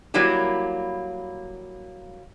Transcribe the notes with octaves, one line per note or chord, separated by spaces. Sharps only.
F#3 G3 A#3 E4 G4